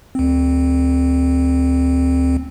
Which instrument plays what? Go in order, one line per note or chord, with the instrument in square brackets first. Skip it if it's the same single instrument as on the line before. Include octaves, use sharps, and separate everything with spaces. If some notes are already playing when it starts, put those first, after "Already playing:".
[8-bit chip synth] D2 C4